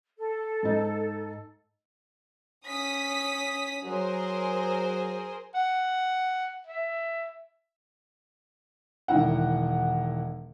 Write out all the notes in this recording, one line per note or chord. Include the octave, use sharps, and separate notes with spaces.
A4
G#2 D#4
C#4 D#6 B6
F#3 G#4 A#4 C5
F#5
E5
E1 D#3 E4 F#5